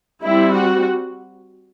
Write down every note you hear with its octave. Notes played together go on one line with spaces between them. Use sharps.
G3 C4 E4
F#4